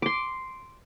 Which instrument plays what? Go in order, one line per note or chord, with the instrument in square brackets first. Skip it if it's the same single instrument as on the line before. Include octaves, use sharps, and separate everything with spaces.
[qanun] C6 D6